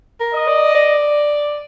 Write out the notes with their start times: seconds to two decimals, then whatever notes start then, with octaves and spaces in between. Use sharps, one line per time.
0.20 A#4
0.34 D#5
0.48 D5
0.75 D5